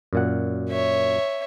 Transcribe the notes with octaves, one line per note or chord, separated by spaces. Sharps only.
F#2 A#2 F#5
C#5 E5